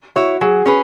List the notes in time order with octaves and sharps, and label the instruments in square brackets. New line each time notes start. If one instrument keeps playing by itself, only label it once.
[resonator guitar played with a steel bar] E4 C#5 [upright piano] F#4
[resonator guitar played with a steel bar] F#3 [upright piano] G#4
[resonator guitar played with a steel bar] C#4 G#4 B4